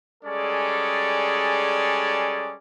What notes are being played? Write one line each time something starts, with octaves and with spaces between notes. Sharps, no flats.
G3 G#3 C#4 G#4 A4 D5